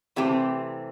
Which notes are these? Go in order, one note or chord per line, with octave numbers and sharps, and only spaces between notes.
C3 E3 A3 C4 G4